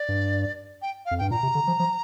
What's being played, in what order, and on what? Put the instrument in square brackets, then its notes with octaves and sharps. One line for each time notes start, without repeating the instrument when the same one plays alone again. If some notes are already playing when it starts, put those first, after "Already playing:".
Already playing: [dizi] D5
[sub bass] G2
[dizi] G5
F5
[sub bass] F2
[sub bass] G2 [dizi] G5
[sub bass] A#2 [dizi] A#5
[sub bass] C3
D3
F3
F3